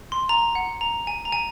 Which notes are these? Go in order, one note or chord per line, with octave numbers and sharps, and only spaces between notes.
C6
A#5
F#5
A#5
G#5
A#5
G#5